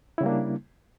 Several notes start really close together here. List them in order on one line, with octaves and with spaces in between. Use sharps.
E4 C#3 G3 A#3 D4